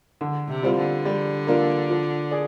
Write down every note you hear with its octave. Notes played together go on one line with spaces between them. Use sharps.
D3
C3
G3 C4 F4
D3
G3
A#3 D4 F4
F3
G#4 D5